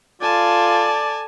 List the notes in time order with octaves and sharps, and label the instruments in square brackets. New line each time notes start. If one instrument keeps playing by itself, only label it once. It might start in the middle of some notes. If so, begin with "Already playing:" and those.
[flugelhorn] F4 [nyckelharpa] A4 [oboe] D5 [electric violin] G#5 A5